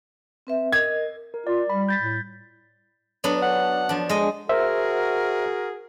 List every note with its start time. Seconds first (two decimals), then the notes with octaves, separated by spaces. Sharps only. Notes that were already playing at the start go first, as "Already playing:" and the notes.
0.47 C4 B4 E5
0.72 A#4 D#5 G#6
1.34 A#4
1.47 F4 D5
1.70 G3 B5
1.89 G6 A6 B6
2.02 A2
3.24 F#3 B3 D4
3.42 F#5
3.89 F3 D4
4.09 G#3 D#5
4.49 F#4 G#4 A#4 C5 E5